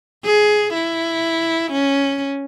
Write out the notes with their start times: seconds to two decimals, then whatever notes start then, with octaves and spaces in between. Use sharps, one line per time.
0.25 G#4
0.73 E4
1.71 C#4